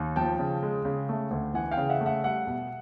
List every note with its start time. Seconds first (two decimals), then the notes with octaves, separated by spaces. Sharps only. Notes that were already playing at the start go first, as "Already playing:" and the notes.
Already playing: D#2
0.16 F3 G5 A5
0.39 C#3
0.63 G#3
0.85 C#3
1.09 A3
1.31 D2
1.54 E3 F#5 G#5
1.71 F5 G5
1.77 C#3
1.89 E5 F#5
2.01 A3 E5 F#5
2.24 G3 E5 F#5
2.47 B2